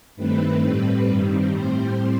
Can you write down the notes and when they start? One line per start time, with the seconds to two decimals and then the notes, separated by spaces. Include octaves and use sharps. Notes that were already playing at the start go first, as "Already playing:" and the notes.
0.16 G2 D#3 A3 C4 B4
0.60 A2 G3 C4
1.06 G2 D#3 G3 C4
1.51 A2 G3 C4 C5